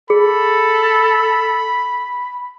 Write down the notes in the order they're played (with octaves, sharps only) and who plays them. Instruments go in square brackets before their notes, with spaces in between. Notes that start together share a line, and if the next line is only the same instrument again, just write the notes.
[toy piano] G#4 [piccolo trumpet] A4 [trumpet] B5